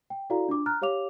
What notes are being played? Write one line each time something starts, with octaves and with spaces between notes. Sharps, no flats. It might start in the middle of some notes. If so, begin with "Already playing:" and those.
G5
E4 F#4 A4 D5 F5 A#5
D4 F4 D6
A#5 F6 F#6 A6
G4 C#5 F5 D6 F7